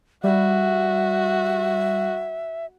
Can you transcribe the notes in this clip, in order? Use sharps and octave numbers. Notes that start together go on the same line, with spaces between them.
G3 F#4 E5